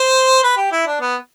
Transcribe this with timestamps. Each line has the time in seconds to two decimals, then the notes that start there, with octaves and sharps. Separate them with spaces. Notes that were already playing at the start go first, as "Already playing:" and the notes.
Already playing: C5
0.44 B4
0.57 G4
0.72 E4
0.87 D4
1.01 B3